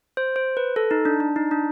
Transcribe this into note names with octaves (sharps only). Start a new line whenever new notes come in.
C5
C5
B4
A4
D#4
D4
D4
D#4
D4